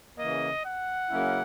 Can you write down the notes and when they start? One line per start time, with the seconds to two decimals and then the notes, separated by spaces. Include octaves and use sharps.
0.18 C#3 E3 A#3 D#5
0.64 F#5
1.10 C#3 F#3 A#3 C#4 E4